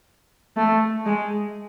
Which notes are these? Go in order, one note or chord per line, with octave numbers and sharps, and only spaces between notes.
A3
G#3